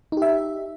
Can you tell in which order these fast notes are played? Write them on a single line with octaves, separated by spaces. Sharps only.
D#4 G4 E5